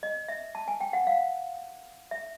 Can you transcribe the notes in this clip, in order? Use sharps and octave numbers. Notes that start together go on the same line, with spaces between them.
D#5
E5
A5
G#5
G5
F#5
F5
E5